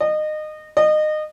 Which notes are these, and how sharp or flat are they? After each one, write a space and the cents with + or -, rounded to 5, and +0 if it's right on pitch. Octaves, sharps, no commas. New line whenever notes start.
D#5 -25
D#5 -25